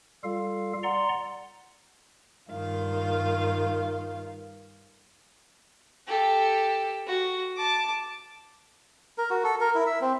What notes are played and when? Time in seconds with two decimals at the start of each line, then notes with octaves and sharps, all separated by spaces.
0.24 G3 F4 A4 F5
0.83 D5 F#5 A#5 C6
2.51 G2 D#3 F4 F5
6.07 G4 A4
7.07 F#4
7.56 A5 D6
9.18 A#4
9.30 F#4
9.44 A4
9.61 A#4
9.75 E4
9.86 E5
10.01 C4